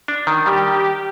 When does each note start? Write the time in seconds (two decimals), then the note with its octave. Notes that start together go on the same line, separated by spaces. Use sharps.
0.08 D4
0.27 D#3
0.46 G3 G4